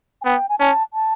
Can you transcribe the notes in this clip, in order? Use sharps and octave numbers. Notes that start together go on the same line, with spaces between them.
G#5
B3 G5
G#5
C#4 A5
A5